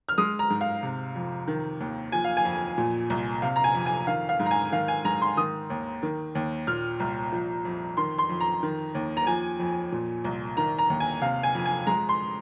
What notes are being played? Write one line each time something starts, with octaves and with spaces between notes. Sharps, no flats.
F6
G#3 D#6
A#5
G#2
F5
C3
F2
D#3
D#2
F3 G#5
F5
G#5
F2
A#2
C2
C3 F5
A#5
G#5
F2
G#5
D#3 F5
F5
G#2
A#5
G#5
D#3 F5
G#5
G#2 A#5
C6
D#3 D#6
D#2
D#3
D#2
A#2 F6
C2
F3
F2
D#3 C6
C6
F2
A#5
D#3
D#2
A#5
F3 G#5
F2
A#2
C2
D#3 A#5
A#5
D#2
G#5
C3 F5
G#5
F2
G#5
G#3 A#5
C6